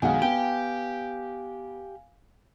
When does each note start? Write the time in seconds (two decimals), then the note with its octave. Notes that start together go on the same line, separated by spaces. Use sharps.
0.02 B1 D#3 G#3 F5 F#5 G#5
0.22 B3 G4 G5